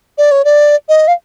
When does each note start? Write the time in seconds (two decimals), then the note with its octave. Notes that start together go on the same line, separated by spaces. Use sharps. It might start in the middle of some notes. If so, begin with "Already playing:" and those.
0.18 D5
0.31 C#5
0.45 D5
0.89 D#5
1.08 F5